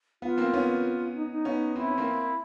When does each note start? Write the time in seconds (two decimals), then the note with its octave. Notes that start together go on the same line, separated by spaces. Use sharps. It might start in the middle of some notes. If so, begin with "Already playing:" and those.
0.22 B3 F4
0.38 A#3 C4
0.53 B3 C#4
1.15 D#4
1.31 D#4
1.45 B3 C#4
1.76 C4 E4
1.88 C#4
1.98 A#3 C4